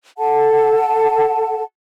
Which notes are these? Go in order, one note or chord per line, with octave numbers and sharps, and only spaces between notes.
A4 F#5 A5